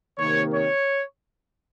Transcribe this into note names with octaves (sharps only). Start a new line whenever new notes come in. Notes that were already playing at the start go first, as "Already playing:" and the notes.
C3 D#3 A#3 C#5
C#5